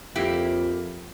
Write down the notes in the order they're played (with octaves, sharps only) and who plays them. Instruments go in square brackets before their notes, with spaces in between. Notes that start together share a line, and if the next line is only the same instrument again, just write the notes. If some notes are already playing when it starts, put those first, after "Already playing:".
[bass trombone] F2 [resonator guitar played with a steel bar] A#3 E4 G4